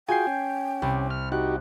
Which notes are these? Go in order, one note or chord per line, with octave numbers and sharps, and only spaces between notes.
F4 F#4 G#4 G5 G#5 G6 C7
C#4
C2 G4
F6
D#4 F#4 G4 F#6